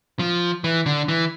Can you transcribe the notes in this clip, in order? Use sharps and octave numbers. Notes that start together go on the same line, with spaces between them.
F3
E3
D3
E3